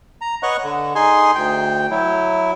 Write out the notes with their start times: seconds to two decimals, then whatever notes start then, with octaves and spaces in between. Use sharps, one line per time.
0.21 A#5
0.43 B4 C#5 D#5 F#5 C#6 F#6
0.63 D3
0.95 D#4 G#4 G#5 C6
1.35 D2 G5
1.91 F#3 E4